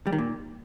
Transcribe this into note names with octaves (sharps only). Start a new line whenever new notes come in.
G3
D#3
A#2